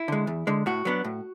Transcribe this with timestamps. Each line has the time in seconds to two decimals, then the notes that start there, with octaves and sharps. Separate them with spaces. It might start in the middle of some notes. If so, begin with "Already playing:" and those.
Already playing: E4
0.08 D3 G#3
0.27 E2
0.47 D3 G#3
0.66 A2 F#4
0.85 F#3 B3 D4
1.05 A2